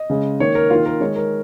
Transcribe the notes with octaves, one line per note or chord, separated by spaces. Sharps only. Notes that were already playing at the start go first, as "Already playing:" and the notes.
Already playing: D#5
C#3 G#3
D#3 A#3 C#5
A#4
D#3 A#3 F4
A#4
D#3 G#3 C#5
A#4